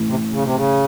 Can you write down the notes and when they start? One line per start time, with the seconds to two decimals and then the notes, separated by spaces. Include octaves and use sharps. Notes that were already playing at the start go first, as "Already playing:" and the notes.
Already playing: A1 A2 E3
0.08 C3
0.31 C#3
0.44 C3
0.55 C#3